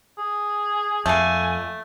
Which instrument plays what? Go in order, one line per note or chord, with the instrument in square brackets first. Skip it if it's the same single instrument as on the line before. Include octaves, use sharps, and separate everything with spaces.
[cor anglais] G#4
[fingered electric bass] F2 [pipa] A3 A#3 [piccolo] G#5